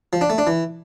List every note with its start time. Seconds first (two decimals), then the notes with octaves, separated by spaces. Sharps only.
0.13 F3
0.21 D4
0.30 A3
0.38 D4
0.47 E3